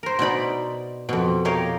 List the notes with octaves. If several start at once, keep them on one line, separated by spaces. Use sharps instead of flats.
A#4 C5
B2 D#4 D5 B5
F2 B2
G4 A#4 C#5 D#5 F5